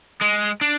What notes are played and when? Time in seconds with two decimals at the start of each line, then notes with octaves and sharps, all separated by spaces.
0.21 G#3
0.61 D4